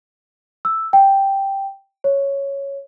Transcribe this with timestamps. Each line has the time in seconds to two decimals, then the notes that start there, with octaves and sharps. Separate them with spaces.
0.65 E6
0.93 G5
2.04 C#5